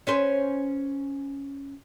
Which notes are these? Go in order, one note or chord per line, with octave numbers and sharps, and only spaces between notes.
C#4 B4 C5